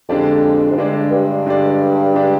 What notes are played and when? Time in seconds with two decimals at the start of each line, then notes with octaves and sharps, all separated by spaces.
0.09 F2 D3 G#3 D4 G4 D5
0.71 G#2
0.77 G2 D3 G#3 D4 G4 D5
1.11 G2
1.46 D3 G#3 D4 G4 D5
2.14 D3 G#3 D4 G4 D5